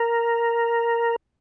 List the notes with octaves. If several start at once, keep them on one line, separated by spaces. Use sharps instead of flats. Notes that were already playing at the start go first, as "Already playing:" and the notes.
Already playing: A#4